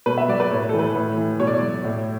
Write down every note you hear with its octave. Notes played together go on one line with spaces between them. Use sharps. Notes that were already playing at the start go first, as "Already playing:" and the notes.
B2 B4
E5
F#3 D5
B4
A2 C#5
B4
A4
E3
B4
A2
E3
B2 C#5
D5
C#5
F#3
A2